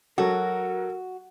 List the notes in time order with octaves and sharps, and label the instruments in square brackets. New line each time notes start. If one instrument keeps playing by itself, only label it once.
[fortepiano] F#3 A4 [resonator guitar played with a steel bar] F#4 [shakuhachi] A#4